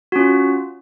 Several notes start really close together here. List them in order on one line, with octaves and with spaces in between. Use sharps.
F#4 C#4 F4